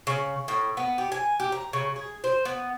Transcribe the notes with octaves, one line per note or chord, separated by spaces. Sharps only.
C#3
A2
B3
G4
G#5
G4
A#5
C#3
G#4
C5
B3